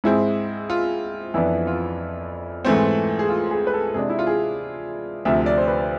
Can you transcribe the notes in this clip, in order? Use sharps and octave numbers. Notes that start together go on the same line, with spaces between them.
G#2 G#3 C4 E4
F4
F2 E3 B3 D4 E4
F4
G#2 E3 A3 C4
G#4
F4
G#4
B4
A4
C3 G#3 D4 G#4
E4
F4
G#4
D2 C3 F3 E5
D5
C5
B4